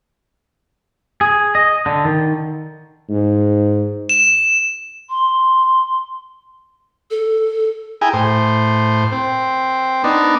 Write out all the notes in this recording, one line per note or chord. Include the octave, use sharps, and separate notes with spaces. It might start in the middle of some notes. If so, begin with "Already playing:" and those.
G#4
D#5
D3
D#3
G#2
E7
C6
A4
E4 G#4 G5 G#5 A#5
A2 C5
C4
B3 D4 D#4